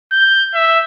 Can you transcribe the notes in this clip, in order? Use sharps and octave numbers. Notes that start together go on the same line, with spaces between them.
G6
E5